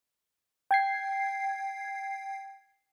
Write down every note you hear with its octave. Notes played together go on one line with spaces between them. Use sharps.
G5 G#6 C7